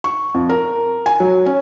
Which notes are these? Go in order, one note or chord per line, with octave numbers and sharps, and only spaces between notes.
C#6
F2
A#4
G#5
F#3
C#4